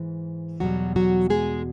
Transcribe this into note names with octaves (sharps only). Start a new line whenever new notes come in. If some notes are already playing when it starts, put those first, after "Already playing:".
Already playing: G#2 E3
E2 B2 F#3 G3 F#4
F#3 F#4
G#3 G#4